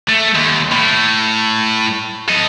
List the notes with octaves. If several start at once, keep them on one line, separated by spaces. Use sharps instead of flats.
A3
D#2
A2
A4 D#5